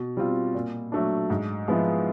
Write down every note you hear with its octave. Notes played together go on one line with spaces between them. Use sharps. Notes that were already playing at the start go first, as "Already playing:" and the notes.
Already playing: B2
G3 C4 F4
A#2
F#3 A3 D4
G#2
F3 G#3 B3 E4